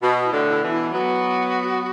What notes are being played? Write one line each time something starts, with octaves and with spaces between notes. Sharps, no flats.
B2 F#4
E4
A2 D3
E4
B2 E3
E4
F#3 B3 F#4